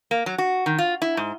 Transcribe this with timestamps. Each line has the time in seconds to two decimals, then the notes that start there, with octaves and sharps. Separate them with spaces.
0.11 A#3
0.26 F#3
0.38 F#4
0.66 D#3
0.79 F4
1.02 E4
1.17 G#2